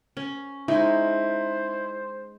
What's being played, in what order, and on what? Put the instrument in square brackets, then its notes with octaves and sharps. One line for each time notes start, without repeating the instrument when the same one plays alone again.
[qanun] C#4
[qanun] G#3 D#4 [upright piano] E4 [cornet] C5